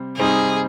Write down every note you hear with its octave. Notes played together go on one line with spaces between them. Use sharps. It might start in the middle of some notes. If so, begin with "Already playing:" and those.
Already playing: C3 G3 C4
C3 G3 C4 D#4 G#4